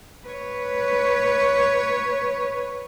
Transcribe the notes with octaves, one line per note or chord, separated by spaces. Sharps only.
B4 C#5